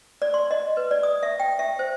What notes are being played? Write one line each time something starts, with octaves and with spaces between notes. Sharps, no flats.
D5
C6
D#5
B4
D5
D#6
E5
G5
E5
C5